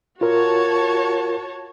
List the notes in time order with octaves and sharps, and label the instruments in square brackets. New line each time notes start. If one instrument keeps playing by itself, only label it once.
[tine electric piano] F4 A#4 [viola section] F#4 C#5 A5